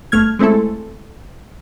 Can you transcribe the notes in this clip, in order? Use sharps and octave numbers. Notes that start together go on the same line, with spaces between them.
G1 A3 F6 G#6
G#3 A3 C4 E4 A4